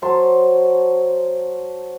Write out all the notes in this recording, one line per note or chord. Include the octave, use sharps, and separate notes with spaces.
F#3 C5 A5